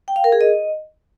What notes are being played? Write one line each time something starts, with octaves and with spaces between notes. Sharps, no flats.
G5
F5
A#4
G#4
D#5